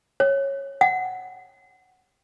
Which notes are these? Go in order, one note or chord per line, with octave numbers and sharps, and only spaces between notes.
C#5
F#5